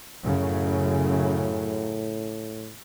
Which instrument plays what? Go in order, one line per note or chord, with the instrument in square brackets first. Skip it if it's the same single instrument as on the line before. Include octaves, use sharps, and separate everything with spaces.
[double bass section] F#2 C#3 [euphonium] A2